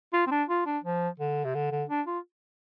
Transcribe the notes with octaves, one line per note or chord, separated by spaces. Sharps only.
F4
C4
D4
F4
D4
F3
D3
C3
D3
D3
D4
F4